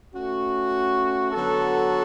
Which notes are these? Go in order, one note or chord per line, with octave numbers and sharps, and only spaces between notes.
A3 C#4 F#4
D3 F#3 B3 F#4 A4